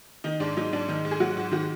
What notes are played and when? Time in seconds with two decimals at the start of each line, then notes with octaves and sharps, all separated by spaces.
0.24 D#3 D#4
0.40 G#2 D4
0.57 F#3 D#4
0.73 G#2 D4
0.88 D#3 D#4
1.05 G#2
1.11 G#4
1.20 F#3 F#4
1.37 G#2
1.51 D#3 F#4